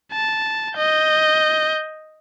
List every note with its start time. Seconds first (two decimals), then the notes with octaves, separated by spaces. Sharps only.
0.12 A5
0.77 D#5 G6